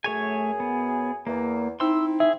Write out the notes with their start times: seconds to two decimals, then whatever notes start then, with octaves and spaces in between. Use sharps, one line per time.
0.04 F#2 A3 G#4 C#5 G#5
0.60 B3
1.27 E2 A#3
1.80 C4 D#4 E4 C6 E6
2.20 G#4 E5